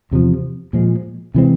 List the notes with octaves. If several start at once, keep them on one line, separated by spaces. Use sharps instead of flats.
E2 C3 F3
A#2 F3 G#3
C3 E3 G#3 C4